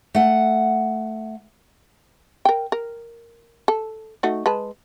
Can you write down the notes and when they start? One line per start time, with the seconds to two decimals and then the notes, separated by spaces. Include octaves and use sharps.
0.15 A3 F#5
2.45 A#4 G5
2.72 A#4
3.68 A4
4.23 A3 D#4 F#4
4.46 G#3 B4 A5